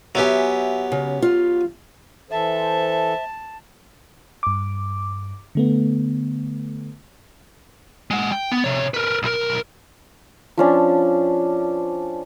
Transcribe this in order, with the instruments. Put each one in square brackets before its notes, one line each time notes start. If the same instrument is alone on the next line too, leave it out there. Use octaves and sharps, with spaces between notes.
[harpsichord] F#3 B3 G4 [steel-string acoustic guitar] E5 G#5
[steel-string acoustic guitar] C#3
F4
[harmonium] E3 A4 [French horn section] C5 [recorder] E5 [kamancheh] A5
[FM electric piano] G2 D6
D3 A3 B3
[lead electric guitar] G#3 F#5
G5
B3
C3 C#5
A#4 B4
B1 A#4
[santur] F3 C#4 D4